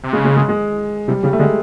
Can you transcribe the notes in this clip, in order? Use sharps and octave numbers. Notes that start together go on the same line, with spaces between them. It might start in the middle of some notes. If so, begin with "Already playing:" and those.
C3
C#3 G#3
G#3
G#3
G#3
C3 G3
C#3 G3
A3
D3 G#3